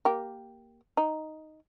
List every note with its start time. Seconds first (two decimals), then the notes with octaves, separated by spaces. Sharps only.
0.05 A#3 G4
0.97 D#4